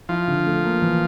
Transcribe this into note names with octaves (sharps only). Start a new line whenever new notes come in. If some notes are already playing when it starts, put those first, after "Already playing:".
F3 E4
D3
A3
A#3
E3